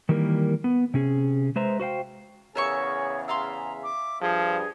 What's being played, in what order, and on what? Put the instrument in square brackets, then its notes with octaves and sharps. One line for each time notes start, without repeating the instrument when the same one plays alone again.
[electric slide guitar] D#3 E3 G3 A#3 A#4
B3
C3 C#4 G#4
G#3 B4 C5 E5 A#5
F#4 C5 F5 G5
[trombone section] E2 C#3 G#4 [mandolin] A#4 E5 C#6 [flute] C#5
[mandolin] E5 F5 C6 [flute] A#5
[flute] D6
[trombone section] G2 [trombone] F3 [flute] G#4